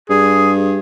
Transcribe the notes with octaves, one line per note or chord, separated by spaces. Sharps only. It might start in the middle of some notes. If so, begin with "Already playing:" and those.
G2 G#4